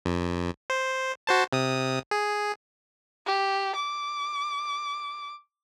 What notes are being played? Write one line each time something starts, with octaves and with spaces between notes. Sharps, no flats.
F2
C5
F#4 C5 A5
C3 D#6
G#4
G4
D6